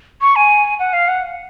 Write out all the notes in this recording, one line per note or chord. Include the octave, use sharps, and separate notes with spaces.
C#6
G#5
F#5
F5
F#5